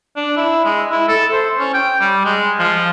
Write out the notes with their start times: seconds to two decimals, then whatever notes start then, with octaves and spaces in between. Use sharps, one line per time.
0.16 D4
0.37 E4
0.65 G#3
0.91 E4
1.08 A4
1.33 C5
1.58 C#4
1.74 G5
2.00 G3
2.24 G#3
2.59 F3